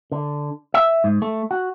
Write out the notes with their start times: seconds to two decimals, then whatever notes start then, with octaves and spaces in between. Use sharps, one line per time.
0.12 D3
0.74 E5
1.04 G#2
1.22 A3
1.51 F#4